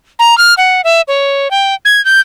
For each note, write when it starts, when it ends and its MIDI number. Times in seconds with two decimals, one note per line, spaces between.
0.19 0.37 82
0.38 0.54 89
0.58 0.81 78
0.84 1.01 76
1.08 1.51 73
1.51 1.74 79
1.85 2.03 92
2.05 2.20 91